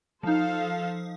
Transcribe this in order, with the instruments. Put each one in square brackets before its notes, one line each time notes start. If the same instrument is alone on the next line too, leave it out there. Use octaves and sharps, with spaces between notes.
[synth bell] F3 D#4 [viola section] A4 C5 F5